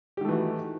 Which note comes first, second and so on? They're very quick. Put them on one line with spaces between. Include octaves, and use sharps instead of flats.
G4 D#3 A3 E3 F#4